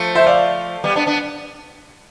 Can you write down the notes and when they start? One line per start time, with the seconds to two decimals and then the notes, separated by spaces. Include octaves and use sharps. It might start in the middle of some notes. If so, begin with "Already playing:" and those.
Already playing: F3 A3
0.15 C5 E5
0.27 D5 F5
0.84 G3 B3
0.96 B3 D4
1.07 B3 D4